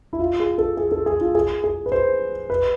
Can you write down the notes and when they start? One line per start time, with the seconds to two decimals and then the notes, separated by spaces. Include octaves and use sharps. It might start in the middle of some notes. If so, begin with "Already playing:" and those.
0.13 E4
0.20 F4
0.40 G#4
0.58 A4
0.77 G#4
0.92 A4
1.06 G#4
1.21 F4
1.35 G#4
1.64 G#4
1.86 B4
1.92 C5
2.50 B4